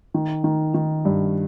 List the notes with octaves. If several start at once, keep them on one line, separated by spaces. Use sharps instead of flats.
D#3
D#3
D#3
G2